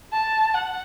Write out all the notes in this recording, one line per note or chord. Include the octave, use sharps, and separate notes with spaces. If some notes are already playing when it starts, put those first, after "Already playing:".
A5
F#5